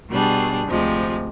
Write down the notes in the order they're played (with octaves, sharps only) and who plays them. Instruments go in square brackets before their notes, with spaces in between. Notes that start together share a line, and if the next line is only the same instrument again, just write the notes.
[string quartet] B2 G3 D4 G#4
D2 C3 F3 G#3